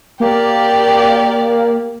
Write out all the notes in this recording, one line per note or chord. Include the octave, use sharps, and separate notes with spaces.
A#3 G4 D5